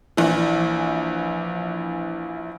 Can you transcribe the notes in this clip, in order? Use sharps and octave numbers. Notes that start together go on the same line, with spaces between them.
A#1 E3